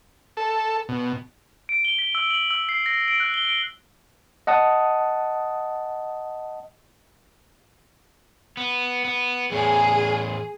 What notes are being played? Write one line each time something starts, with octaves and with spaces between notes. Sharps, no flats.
A4
B2
D7
G7
B6
E6
F#7
E6
C7
A#6
D7
F#6
G7
D7
D#5 F#5 A5 D#6
B3
B3
E2 A2 G#4